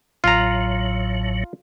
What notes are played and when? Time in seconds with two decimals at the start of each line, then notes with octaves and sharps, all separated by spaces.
0.24 A1 A2 F#3 F4 A#5